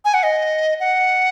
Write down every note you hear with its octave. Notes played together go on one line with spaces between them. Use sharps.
G#5
F#5
D#5
F#5